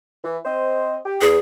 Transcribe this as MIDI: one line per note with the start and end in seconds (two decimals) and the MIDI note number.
0.24 0.38 52
0.45 0.97 60
0.45 0.97 72
0.45 0.97 75
1.05 1.18 67
1.21 1.37 40
1.21 1.38 68